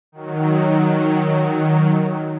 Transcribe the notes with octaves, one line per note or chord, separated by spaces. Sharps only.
D#3 F#3